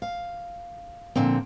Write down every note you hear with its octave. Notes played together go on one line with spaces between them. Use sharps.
F5
A#2 D3 F3 C4